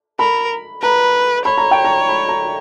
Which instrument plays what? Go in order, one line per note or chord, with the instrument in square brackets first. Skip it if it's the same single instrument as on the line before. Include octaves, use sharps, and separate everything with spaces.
[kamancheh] A#4 [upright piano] B5
[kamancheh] B4 [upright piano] A#5
[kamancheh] C#5 [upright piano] B5
[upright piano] A#5
G5
A#5
B5
A#5